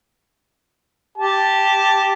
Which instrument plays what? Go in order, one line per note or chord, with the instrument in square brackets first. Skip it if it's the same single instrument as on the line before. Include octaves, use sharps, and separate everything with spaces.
[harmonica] G4 A5